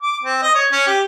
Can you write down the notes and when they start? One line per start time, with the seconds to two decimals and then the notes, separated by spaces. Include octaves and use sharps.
0.02 D6
0.23 C4
0.42 D#5
0.55 C#5
0.72 C#4
0.87 G4